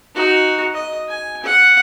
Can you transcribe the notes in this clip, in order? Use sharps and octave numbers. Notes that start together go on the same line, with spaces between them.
D#4 F#4
D#5
G#5
F#5